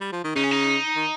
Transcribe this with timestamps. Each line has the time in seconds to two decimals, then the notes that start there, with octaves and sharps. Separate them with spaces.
0.01 G3
0.12 F3
0.24 D#3
0.35 C#3 D#4
0.43 C#4
0.51 D#4
0.96 D#3